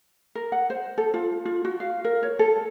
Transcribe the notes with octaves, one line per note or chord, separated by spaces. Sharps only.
A#4
F#5
C5
A4
F4
F4
F#4
F5
A#4
C#5
A4